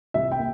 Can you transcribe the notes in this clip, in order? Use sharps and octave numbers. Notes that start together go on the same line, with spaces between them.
C2 E5
G5
A#3